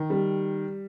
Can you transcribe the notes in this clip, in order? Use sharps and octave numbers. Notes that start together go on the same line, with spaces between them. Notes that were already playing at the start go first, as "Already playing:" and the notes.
Already playing: D#3
G3